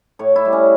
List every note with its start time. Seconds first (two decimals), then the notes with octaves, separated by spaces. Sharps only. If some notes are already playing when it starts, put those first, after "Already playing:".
0.19 A2 C#5
0.36 E4
0.45 G3
0.53 C#4